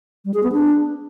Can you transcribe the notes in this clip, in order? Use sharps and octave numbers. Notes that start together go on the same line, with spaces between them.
G3
G#4
B3
D4